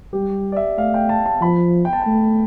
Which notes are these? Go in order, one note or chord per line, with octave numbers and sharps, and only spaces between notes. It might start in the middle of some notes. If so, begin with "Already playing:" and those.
G3 G4
D5
E5
A3 F5
G5
A5
A5
F3 B5
G5
A5
A3 G5